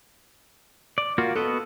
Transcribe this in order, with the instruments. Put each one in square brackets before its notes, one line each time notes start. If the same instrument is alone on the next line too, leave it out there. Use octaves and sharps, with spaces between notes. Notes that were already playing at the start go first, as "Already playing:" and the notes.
[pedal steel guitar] D5
A#3 F4 F#4
[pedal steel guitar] B3 F#4 D#5 [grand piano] A4